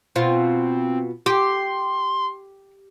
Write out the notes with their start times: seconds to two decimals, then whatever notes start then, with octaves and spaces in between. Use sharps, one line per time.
0.16 B2 C4 F4
1.26 G4 C6